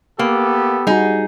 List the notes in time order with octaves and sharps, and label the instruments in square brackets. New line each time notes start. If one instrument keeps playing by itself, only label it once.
[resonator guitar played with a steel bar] A#3 [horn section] B3 G4 A4
[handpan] G3 F#4 [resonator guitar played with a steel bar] D#4 G#4